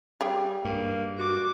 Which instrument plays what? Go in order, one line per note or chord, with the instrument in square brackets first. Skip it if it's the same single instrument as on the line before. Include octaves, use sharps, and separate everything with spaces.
[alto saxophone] G3 [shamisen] G4 G#4 G5
[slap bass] G2 [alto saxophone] A#3
[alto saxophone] F#4 [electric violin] D6